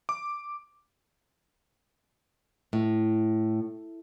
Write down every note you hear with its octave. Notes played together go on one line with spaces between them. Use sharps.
D6
A2